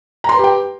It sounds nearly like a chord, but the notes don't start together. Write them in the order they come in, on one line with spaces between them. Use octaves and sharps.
A#5 C6 B4 G4 G5